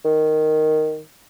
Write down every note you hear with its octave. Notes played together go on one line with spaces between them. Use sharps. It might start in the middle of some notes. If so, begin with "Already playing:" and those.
D#3